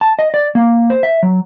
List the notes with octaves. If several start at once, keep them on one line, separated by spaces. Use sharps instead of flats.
A5
D#5
D5
A#3
C5
E5
F#3